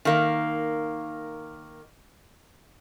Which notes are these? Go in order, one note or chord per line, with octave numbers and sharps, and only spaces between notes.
D#3 A#3